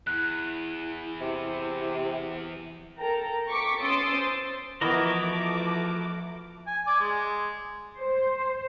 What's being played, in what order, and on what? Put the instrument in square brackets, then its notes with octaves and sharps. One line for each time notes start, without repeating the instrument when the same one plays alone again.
[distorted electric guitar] E2 [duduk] E4 [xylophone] F#6
[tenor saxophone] C3
[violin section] A4 A#4 G5 A#5
C#6 D6 B6 C#7
C#4 C6 D#6 E6 A6 D7
C5
[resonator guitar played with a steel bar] E3 B3 [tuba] F3 [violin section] A3 D6 [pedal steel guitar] F#4 A#4 D#5
[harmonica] G#5
D5 G#5 D6
G#3
[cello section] C5